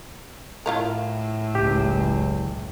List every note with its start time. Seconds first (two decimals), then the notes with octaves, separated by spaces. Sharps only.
0.66 A2 E4 F4 A#4
1.55 F#1 C#2 G4